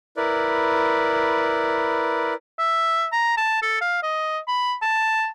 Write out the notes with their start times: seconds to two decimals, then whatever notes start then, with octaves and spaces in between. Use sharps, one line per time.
0.17 E4 A#4 B4 D5
2.59 E5
3.12 A#5
3.37 A5
3.62 A4
3.81 F5
4.03 D#5
4.48 B5
4.82 A5